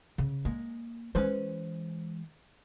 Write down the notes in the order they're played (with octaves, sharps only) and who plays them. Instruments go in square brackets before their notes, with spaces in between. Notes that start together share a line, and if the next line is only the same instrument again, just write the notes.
[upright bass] C#3
[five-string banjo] G#3 [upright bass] A#3
[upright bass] E3 G#3 [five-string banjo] C#4 B4 C5